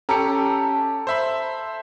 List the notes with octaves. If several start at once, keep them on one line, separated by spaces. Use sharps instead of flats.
C#4 G4 A4 A#5 C#7
C5 E5 B5